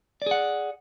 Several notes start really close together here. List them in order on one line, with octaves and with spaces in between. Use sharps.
D5 G#4 F#5